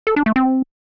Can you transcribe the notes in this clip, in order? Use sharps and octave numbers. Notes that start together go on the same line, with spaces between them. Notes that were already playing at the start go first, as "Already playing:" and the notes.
A4
D4
A3
C4